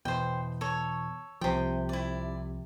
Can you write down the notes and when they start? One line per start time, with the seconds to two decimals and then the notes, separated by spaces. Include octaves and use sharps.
0.05 E2 B2 E3 C5 G5
0.61 A4 C#5
1.41 C2 C3 F3 G5
1.89 E4 D5